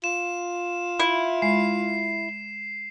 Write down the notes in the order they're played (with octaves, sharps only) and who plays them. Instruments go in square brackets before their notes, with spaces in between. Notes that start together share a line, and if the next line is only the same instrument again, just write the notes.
[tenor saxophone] F4 [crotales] E7
[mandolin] E4
[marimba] G#3 [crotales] C7